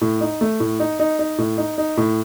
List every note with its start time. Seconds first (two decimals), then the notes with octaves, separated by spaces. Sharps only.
0.01 A2
0.21 D#4
0.41 A3
0.60 A2
0.80 D#4
0.99 D#4
1.19 D#4
1.38 A2
1.58 D#4
1.78 D#4
1.97 A2